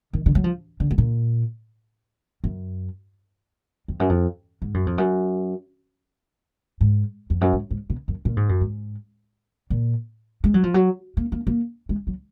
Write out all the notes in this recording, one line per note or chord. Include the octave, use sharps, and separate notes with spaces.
D#3
D3
F#3
F3
D3
G#2
A#2
F#2
F2
F#2
F2
G#2
F#2
F2
F#2
G#2
F2
F#2
G#2
G#2
B2
F#2
A#2
G#2
F#2
G#2
A#2
G#3
F#3
F3
F#3
A#3
A#3
A#3
G#3
F#3